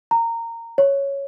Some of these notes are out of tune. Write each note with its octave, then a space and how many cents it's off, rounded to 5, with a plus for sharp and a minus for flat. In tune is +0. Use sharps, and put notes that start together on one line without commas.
A#5 -20
C#5 +0